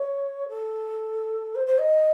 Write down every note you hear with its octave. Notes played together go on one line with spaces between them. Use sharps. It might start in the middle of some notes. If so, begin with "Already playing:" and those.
Already playing: C#5
A4
C5
C5
D#5